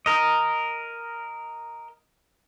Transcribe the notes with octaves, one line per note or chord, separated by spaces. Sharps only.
A#4 D#5